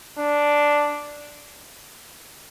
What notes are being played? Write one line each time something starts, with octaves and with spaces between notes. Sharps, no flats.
D4